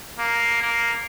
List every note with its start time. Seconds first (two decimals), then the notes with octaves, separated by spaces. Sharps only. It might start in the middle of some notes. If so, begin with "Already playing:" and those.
0.19 A#3
0.62 A#3